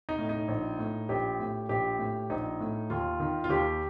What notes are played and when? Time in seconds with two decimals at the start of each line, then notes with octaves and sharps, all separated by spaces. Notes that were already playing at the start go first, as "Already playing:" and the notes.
0.09 D#4
0.18 A2
0.29 D#4
0.48 A#1
0.79 A2
1.09 A#1 G4
1.39 A2
1.69 A#1 G4
1.99 A2
2.30 A#1 D#4
2.60 A2
2.90 D#2 F4
3.20 D#3
3.44 F4
3.49 D#2 G4